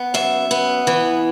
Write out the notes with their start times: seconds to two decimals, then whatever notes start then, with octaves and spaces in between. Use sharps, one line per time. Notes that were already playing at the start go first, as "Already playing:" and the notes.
Already playing: B3
0.14 F#2 E5
0.51 B3
0.87 E3